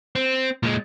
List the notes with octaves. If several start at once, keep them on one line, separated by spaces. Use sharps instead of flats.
C4
A#2 G#3